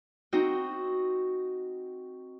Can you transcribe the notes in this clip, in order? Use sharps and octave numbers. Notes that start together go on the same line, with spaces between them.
C4 D#4 F#4